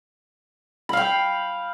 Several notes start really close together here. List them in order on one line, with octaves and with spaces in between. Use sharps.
B5 F5 G5